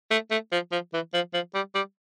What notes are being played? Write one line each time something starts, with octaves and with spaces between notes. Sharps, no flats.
A3
A3
F3
F3
E3
F3
F3
G3
G3